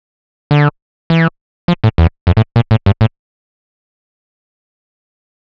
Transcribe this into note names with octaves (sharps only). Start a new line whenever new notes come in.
D3
E3
F3
A2
E2
F2
A2
A#2
A2
G2
A2